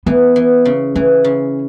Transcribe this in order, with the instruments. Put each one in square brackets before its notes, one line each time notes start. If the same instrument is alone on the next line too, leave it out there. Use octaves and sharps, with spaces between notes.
[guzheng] E3 [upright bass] B3
[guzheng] E3
C#3
[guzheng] E3 [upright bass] C#4
[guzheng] C#3